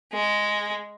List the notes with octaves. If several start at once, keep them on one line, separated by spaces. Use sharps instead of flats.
G#3